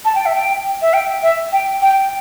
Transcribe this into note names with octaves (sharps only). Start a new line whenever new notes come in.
A5
G5
E5
G5
E5
G5
E5
G5
G5